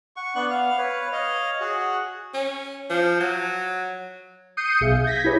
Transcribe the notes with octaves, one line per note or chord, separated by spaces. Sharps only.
F#5 C#6
B3 D4 C#6 F#6
F5
B4 C#5
C#5 D#5 F5
F#4 G#4 F#5
C#4
F3
F#3
D#6 G6 C7 C#7 D#7
B1 G#4 E5 F5
G6 G#6 A#6 B6
E4 G4 G#4 B4 C#5 E5